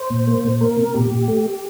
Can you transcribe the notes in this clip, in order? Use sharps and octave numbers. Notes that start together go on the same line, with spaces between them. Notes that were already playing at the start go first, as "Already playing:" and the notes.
Already playing: C5
A#2
A#3
A#2
A#3 A#4
C3
A#2 G4
A#2
A3